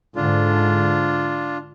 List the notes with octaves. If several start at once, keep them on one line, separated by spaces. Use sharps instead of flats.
G#2 D3 D4 F4